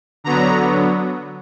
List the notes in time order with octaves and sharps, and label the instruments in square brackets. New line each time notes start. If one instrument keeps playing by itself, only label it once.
[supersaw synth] D3 F#3 B3 A#5